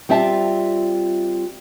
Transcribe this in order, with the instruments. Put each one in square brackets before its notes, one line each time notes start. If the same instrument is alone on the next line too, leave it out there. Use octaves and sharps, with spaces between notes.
[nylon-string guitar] G3 C4 F4 E5 A5